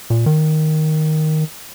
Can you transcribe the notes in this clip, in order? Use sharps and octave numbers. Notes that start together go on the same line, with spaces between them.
A#2
D#3